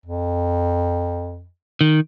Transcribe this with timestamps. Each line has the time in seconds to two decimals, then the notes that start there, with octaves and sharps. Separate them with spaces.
0.06 F2
1.81 D#3